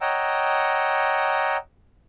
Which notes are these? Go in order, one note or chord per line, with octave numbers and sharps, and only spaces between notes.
C#5 D#5 F#5 G5 A#5 E6